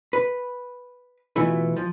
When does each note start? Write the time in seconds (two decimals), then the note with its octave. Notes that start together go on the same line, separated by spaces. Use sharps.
0.13 B4
1.36 B2 E3 A3 E4 F4 B4
1.76 F3